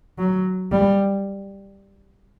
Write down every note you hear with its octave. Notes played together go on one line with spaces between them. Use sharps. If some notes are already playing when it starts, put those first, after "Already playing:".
F#3
G3